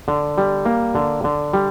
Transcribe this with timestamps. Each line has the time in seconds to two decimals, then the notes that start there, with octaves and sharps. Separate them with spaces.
0.08 D3
0.38 G3
0.65 A#3
0.95 D3
1.24 D3
1.54 G3